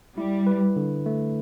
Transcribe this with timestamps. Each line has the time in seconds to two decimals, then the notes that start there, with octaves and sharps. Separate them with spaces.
0.17 G3 E4
0.47 B4
0.76 D3
1.06 A3